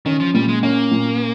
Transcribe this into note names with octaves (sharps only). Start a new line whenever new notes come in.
D#3 C#4
F3
A#2 G3
G#3
A#3 C#4
A#2